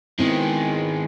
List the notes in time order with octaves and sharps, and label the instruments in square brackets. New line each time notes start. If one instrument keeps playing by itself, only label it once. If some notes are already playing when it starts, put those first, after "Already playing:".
[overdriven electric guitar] D#3 G#3 [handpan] B3 C4 E4